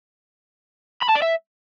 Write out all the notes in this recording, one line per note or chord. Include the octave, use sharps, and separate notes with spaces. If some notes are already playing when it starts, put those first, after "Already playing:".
B5
A5
D5
E5